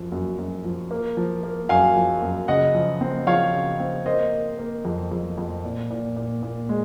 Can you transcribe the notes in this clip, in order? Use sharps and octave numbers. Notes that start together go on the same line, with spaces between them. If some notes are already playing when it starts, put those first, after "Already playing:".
Already playing: F#2 F3
F#2
F#2
F3
A#3
F3
A#3
F#2 F5 G#5
F3
F#2
C#3 D#5 F#5
F3
C4
F3 C#5 F5
C#3
C4
A#3 C5 D#5
A#3
A#3
F2
F2
F2
A#2
A#2
A#2
A#2
G#3